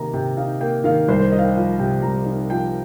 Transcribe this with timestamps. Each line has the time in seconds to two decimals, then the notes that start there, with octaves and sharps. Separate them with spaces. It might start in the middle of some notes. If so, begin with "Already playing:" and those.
Already playing: C3 D#3 A#3 D#4 A#5
0.14 C3 G5
0.37 D#4 F5
0.60 A#3 G5
0.84 D#3 F5
1.08 C2 C5
1.19 C5
1.32 D#4 D#5
1.39 F5
1.44 G5
1.55 F3 F5
1.79 C3 G5
2.02 C2 A#5
2.26 D#4
2.50 F3 G5